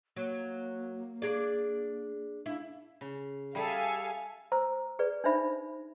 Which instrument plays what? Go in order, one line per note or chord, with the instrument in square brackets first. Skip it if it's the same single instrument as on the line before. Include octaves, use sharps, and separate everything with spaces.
[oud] F#3 [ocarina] A#3
[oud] D4 G#4 D5
[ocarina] D4 [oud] E4
[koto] C#3
[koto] G3 G#4 [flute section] A4 E5 [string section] F5 G#5
[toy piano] C5 A#5 E6
G#4 B4 D5
D4 D#4 C5 E5 B5